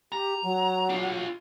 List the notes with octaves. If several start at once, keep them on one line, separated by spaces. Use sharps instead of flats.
G4 A#5
F#3
D4 F4